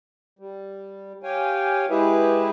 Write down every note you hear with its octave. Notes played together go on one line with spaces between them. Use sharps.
G3
G4 C#5 F5 G5 G#5
G#3 E4 G4 G#4 B4 E5